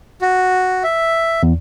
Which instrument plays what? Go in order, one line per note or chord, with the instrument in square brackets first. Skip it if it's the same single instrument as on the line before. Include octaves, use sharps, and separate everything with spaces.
[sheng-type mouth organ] F#4
E5
[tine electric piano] E2